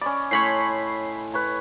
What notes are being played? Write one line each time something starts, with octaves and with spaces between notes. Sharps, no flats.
C#4 D5 D#5 B5
A2 C#5 G#5 B5 C6 C7
B4 C#5 B5